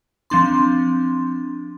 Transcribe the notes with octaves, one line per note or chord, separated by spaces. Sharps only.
F3 C4 D4 C6